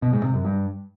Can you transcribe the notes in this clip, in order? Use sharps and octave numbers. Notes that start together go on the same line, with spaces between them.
B2
G#2
C3
F#2
G2